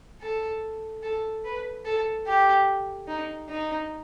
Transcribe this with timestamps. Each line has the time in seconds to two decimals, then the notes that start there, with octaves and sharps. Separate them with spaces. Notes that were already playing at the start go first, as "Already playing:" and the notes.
0.21 A4
1.03 A4
1.44 B4
1.85 A4
2.27 G4
3.08 D#4
3.49 D#4